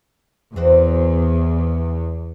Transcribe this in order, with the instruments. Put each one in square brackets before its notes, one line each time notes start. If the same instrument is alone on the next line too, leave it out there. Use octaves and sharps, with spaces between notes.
[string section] E2 [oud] C4 F#4 C5